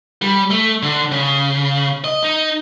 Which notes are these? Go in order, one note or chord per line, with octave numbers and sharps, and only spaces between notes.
G3
A3
D3
C#3
D#5
D#4